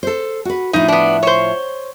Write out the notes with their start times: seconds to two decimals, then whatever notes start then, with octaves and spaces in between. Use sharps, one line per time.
0.03 A4 C5
0.45 F#4 B4
0.73 A2 F3 D#4 E4
0.88 B3 D4
1.23 C5 C#5